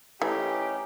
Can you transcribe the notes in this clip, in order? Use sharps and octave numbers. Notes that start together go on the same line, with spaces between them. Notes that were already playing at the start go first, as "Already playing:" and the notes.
E3 A3 C#4 D#4 G4